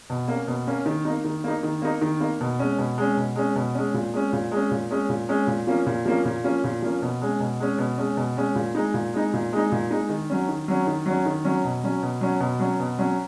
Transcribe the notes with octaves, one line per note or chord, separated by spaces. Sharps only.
B2
A#3 C#4
B2
A#3 C#4
D#3
A#3 D#4
D#3
A#3 D#4
D#3
A#3 D#4
D#3
A#3 D#4
B2
G#3 C#4
B2
G#3 C#4
B2
G#3 C#4
B2
G#3 C#4
A#2
G#3 C#4
A#2
G#3
C#4
A#2
G#3 C#4
A#2
G#3 C#4
A#2
F3 A#3 C#4
A#2
F3 A#3 C#4
A#2
F3 A#3 C#4
A#2
F3 A#3 C#4
B2
G#3 C#4
B2
G#3 C#4
B2
G#3 C#4
B2
G#3 C#4
A#2
G#3 D#4
A#2
G#3 D#4
A#2
G#3 D#4
A#2
G#3 D#4
D#3
F#3 C#4
D#3
F#3 C#4
D#3
F#3 C#4
D#3
F#3 C#4
B2
F#3 C#4
B2
F#3 C#4
B2
F#3 C#4
B2
F#3 C#4